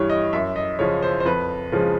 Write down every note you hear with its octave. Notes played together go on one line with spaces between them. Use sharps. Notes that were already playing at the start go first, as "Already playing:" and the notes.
Already playing: G2 E3 G3 C#5
D#5
F#2 E5
D#5
C#3 F3 C#5
C5
C5
F2 B4
C#3 F3 G#3